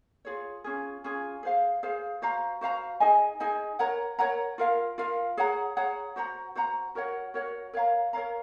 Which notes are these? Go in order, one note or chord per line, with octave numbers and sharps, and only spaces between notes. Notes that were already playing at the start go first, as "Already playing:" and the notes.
F4 G#4 C#5
C#4 F4 G#4
C#4 F4 G#4
G#4 C5 F5
G#4 C5 F5
F#4 C5 F5 A#5
F#4 C5 F5 A#5
D#4 G#4 D#5 G#5
D#4 G#4 D#5 G#5
A#4 C#5 F#5 A#5
A#4 C#5 F#5 A#5
F4 A#4 F5
F4 A#4 F5
G#4 C#5 F#5 A#5
G#4 C#5 F#5 A#5
F#4 C5 F#5 A#5
F#4 C5 F#5 A#5
F#4 A#4 C#5 F#5
F#4 A#4 C#5 F#5
A#4 C#5 F5 A#5
A#4 C#5 F5 A#5